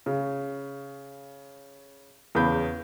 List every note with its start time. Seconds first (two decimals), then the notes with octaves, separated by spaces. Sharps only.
0.06 C#3
2.35 E2 C#3 B3 B5 G6